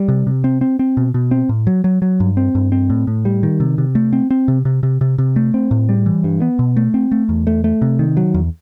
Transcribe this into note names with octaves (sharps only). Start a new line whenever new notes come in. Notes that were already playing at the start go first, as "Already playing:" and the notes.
Already playing: G3
C3
C3
C4
C4
C4
B2
B2
C4
A2
F#3
F#3
F#3
G2
C4
G2
C4
A2
A2
G3
D#3
C3
C3
A3
C4
C4
C3
C3
C3
C3
C3
A3
C4
A2
G3
E3
G2
B3
B2
A3
C4
A3
E2
A3
A3
C3
D#3
F#3
E2